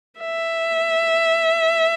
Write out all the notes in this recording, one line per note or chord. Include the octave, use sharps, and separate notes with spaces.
E5